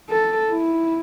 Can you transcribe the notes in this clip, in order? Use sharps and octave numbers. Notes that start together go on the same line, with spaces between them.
A4
E4